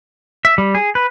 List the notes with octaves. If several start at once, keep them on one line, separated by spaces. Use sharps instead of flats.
E5
G3
G#4
B4